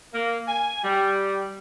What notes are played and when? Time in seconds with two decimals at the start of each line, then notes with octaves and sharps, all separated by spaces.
0.14 A#3
0.48 G#5
0.84 G3